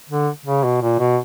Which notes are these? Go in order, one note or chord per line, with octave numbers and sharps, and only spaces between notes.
D3
C#3
B2
A#2
B2